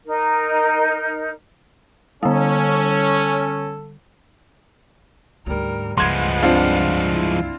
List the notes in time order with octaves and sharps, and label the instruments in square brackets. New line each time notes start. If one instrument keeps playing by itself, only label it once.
[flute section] D#4 A#4
[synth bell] D3 G3 [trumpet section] C#4 [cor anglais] A4
[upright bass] D2 G#2 [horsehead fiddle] G3 A#4
[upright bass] C#2 G2 [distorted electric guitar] F3 G#3 [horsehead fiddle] B4 F#5 [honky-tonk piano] C6 G#6
[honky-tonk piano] C4 D4 F4
[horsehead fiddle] E4